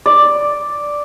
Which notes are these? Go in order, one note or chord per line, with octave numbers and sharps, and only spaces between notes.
D5